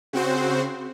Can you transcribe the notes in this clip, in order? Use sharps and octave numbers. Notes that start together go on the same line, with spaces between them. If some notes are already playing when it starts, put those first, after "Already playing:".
C#3 C4 F#4 C5